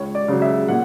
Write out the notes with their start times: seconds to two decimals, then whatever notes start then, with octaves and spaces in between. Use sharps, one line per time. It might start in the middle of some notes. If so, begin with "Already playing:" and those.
Already playing: C#2 C#5
0.15 D5
0.28 C#3 F#3
0.42 E5
0.68 A#2 F#5